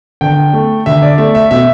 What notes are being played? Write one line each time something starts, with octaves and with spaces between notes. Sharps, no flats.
D3 G5
A3
D3 E5
D5
A3 E5
E5
B2 E5